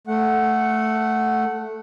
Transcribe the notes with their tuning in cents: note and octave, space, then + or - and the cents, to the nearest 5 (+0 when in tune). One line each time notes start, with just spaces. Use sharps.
A3 +0 F#5 +0